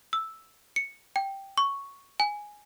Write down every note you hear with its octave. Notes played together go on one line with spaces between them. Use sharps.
E6
C#7
G5
C#6
G#5